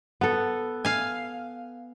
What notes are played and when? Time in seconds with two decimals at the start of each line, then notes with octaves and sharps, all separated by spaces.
0.21 B3 A4
0.85 F5 G#5